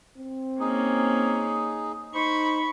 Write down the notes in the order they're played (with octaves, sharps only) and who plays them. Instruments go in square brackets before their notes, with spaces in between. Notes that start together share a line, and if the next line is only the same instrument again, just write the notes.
[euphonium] C4
[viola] A#3 C#4 [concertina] D#4 G#4
[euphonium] D#4 [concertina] C5 [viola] B5 C#6